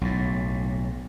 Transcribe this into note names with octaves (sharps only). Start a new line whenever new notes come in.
B1 A2